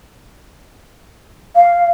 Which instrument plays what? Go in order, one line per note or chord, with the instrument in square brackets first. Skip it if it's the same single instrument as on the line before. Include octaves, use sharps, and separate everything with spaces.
[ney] F5